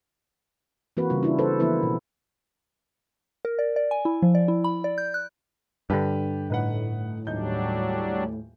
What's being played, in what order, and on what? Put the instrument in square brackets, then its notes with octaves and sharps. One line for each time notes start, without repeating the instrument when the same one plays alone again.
[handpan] E3 A#3 C4 F#4 B4
C#3 G3 F4
D4 E4 F4
A4 B4 C5
E3 F3 A#3 B3 E4 B4
B2
[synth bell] A#4
D5
D5
G#5
E4
F3
D5
E4
B5
D5
G6
F#6
[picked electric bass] G2 D3 [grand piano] G4 B4 A5
[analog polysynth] A2 [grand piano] D#4 B4 F#5
[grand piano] D#1 D#4 G6 [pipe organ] F#3 G3 D4